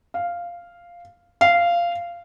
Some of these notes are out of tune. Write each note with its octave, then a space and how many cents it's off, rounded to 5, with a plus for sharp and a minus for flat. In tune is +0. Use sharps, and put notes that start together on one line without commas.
F5 -5
F5 -15